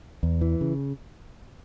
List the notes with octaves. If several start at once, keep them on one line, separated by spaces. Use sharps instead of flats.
E2
E3
C#3